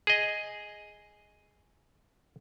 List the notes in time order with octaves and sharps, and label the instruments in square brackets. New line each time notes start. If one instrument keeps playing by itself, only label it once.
[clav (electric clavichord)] G#4 D#5